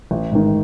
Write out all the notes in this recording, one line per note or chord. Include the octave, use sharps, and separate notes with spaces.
A1
G#2 D#3